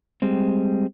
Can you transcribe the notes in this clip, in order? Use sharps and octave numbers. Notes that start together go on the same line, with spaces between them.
G3 G#3 C4